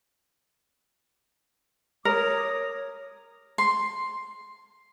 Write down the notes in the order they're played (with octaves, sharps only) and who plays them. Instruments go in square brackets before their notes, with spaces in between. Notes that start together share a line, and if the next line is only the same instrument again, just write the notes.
[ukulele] A#4 [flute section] C#5 D6 D#6
[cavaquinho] C6